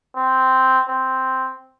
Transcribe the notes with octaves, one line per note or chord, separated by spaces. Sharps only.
C4
C4